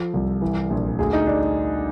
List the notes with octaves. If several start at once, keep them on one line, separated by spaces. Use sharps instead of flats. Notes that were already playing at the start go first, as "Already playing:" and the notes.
Already playing: F3 A4
C2
E3
A#1
D2 G#4
D#4
D4